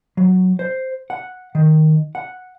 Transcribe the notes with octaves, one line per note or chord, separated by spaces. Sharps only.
F#3
C5
F#5
D#3
F#5